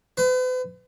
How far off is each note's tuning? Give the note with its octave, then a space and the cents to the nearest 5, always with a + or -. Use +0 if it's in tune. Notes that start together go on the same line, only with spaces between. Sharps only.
B4 +45